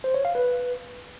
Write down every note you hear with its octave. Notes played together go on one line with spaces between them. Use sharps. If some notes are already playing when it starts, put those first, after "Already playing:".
C5
C#5
F5
B4